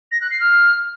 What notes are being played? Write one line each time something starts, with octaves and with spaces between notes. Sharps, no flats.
A#6
F#6
C7
F6